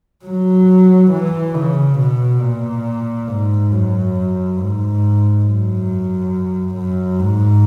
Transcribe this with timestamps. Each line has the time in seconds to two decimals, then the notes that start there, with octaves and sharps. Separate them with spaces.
0.25 F#3
1.11 E3
1.55 C#3
1.99 B2
2.41 A#2
3.28 G#2
3.71 F#2
4.59 G#2
5.45 F#2
6.75 F#2
7.19 G#2